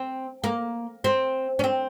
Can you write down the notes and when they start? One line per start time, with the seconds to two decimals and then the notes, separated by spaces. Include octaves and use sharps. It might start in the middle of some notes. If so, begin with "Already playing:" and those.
Already playing: C4
0.44 A#3
1.04 C4
1.59 C#4
1.64 C4